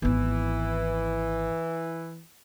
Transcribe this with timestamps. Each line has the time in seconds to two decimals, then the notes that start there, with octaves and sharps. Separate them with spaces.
0.02 G#1 E3 B3